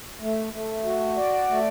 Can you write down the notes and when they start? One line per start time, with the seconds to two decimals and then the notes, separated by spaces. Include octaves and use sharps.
0.21 A3
0.53 A3
0.85 F#4
1.16 D5
1.49 A3